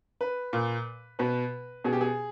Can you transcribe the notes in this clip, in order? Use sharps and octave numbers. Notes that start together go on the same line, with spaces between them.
B4
A#2
B2 B4
B2 G#4
G4
G#4